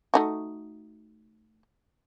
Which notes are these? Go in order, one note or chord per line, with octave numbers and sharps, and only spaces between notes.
A3 D#4 F#4